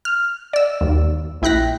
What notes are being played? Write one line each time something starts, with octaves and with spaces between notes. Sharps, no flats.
F6
D5 E6
D#2
A#1 E4 G5 F#6 A#6 B6